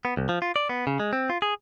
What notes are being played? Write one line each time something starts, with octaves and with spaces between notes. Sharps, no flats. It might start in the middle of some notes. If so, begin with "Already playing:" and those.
B3
C2
F3
F4
D5
B3
C#3
G#3
C4
F4
G#4